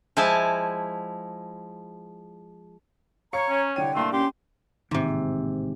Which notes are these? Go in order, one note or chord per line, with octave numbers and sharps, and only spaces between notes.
F3 G#3 E4 G#5 A5
C#5 F5 A#5 C#6 C#7
C#4
C2 D3 C#5 G5 D#7
C2 A3 A#3 D4 C6
C#4 G4 C6
A1 G#2 C3 D#3 A#3